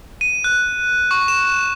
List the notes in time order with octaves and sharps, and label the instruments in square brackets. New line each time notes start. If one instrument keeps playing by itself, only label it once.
[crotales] D#7
F#6
C#6
E7